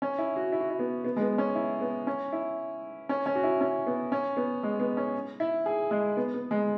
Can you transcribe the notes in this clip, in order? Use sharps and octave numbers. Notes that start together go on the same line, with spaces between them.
C#4
E4
F#4
E4
F#4
E4
B3
B3
G#3
B3
C#4
E4
B3
C#4
E4
C#4
C#4
F#4
E4
C#4
B3
C#4
B3
G#3
B3
C#4
E4
G#4
G#3
B3
B3
G#3